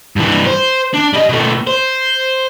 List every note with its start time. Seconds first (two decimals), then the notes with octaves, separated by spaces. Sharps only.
0.16 G2 E3
0.46 C5
0.94 D4
1.13 G3 D#5
1.29 B2 A3
1.67 C5